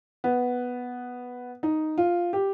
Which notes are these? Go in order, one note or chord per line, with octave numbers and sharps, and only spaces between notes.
B3
D#4
F4
G4